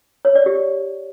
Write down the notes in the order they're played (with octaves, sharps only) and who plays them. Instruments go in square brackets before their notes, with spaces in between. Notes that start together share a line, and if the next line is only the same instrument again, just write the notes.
[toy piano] C#5
D5
G4